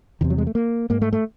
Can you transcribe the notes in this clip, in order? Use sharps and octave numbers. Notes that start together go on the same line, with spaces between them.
E2 C3 D#3
F#3
G#3
A3
A#3
G#2 A#3
A3
A3